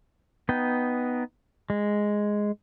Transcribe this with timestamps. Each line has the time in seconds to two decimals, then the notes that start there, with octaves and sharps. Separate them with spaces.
0.49 B3 D#4 G5
1.70 G#3